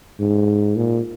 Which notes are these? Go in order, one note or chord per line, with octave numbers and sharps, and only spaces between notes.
G#2
A#2